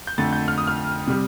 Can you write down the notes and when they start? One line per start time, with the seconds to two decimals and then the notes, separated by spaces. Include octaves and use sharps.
0.07 G6
0.18 F2 D3 A3 A6
0.33 G6
0.48 F6
0.58 D#6
0.67 F6
1.07 C3 G3